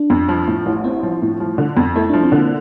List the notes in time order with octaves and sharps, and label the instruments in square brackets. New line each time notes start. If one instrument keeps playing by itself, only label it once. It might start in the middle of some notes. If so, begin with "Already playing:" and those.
Already playing: [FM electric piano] D4
[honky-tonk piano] F2
F3
A2
A1
[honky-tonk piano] C4 [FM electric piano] E4
[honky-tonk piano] F3
A2
F3
D3
F2
[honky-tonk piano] A3 [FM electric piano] E4
[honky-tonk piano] F3 [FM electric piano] D4
[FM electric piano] C4
[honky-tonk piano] D3
[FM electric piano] A#3